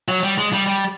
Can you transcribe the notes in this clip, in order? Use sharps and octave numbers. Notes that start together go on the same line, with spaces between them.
F#3
G3
G#3
G3
G3